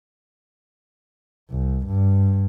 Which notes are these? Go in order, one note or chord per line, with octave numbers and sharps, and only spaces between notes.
C2
G2